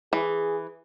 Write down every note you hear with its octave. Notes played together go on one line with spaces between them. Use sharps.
E3 G#4